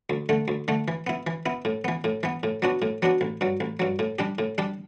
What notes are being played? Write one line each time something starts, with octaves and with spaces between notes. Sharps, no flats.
D2
D3 A3
D2
D3 A3
E3
B3 E4
E3
B3 E4
A2
E3 B3
A2
E3 B3
A2
F#3 B3 D4 F#4
A2
F#3 B3 D4 F#4
A1
G2 F#3
A1
G2 F#3
A2
G3 D4 G4
A2
G3 D4 G4